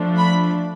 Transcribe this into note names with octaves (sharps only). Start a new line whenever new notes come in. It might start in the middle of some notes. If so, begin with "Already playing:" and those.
Already playing: F3 A3 D4
B5